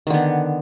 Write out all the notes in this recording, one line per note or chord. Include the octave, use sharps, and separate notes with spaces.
D3 D#3 B3